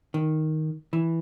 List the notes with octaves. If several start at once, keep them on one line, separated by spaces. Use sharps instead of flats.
D#3
E3